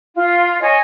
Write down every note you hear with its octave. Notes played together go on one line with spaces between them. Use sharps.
F4
C#5 D#5 G#5